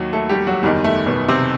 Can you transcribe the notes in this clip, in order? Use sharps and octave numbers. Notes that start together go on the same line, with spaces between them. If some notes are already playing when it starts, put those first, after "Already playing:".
Already playing: D#2 D#3 F#3 F#4
A3 A4
G3 G4
F#3 F#4
F#1 E2 D#3 G3
A3
B2 B3
C3 C4